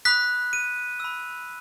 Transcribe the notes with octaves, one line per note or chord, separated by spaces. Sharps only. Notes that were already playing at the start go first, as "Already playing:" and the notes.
B5 D#6 F#6 B6
D#7
B5 E6